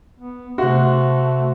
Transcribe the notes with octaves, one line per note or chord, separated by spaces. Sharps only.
B3
C3 A3 F#4 F#5 C6